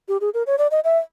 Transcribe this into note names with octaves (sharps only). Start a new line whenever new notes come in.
G4
G#4
A#4
C#5
D5
D#5
E5